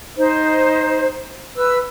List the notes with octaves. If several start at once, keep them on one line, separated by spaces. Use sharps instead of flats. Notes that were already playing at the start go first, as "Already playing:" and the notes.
D#4 C5
B4 E6